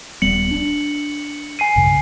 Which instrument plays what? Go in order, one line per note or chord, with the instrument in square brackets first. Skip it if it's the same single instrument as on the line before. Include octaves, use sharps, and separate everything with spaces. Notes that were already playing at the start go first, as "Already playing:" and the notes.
[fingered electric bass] D#1 G3 B3 [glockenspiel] C#7 F#7
[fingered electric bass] D4
[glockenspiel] G#5 C7 D#7
[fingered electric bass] B1 G2 C#3